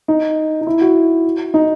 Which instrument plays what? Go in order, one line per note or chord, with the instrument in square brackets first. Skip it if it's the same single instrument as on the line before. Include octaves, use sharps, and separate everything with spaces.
[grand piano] D#4
D#4
E4
F#4
D#4